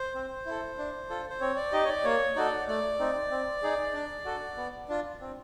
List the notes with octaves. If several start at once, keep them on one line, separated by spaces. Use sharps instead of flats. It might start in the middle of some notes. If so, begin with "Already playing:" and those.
Already playing: C5
C4
E4 A4
D4
F4 A4
C5
C4 C#5
D5
D#4 G4 D#5
C#5
D5
A#3 C#5
D#4 F#4 A4 D5
A3 D5
C4 D#4
C4
D#4 G#4
D4
F#4 A4
B3
D4 F4
C4